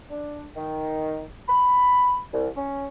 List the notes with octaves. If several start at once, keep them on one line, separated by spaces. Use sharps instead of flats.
D4
D#3
B5
C2
C#4